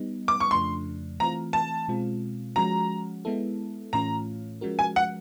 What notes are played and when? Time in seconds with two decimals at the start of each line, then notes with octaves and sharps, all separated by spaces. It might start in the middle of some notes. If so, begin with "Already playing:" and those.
Already playing: G3 B3 D#4
0.28 D6
0.40 C#6
0.51 F2 C#3 F3 A3 D4 C6
1.20 E3 A3 C4 F4 A#5
1.53 A5
1.88 B2 G#3 C4 F4
2.56 F3 G#3 C#4 F#4 A#5
3.25 G#3 B3 E4 A4
3.93 A2 E3 A3 C#4 F4 A#5
4.61 F3 G#3 C#4 F#4 A#4
4.79 G#5
4.96 F#5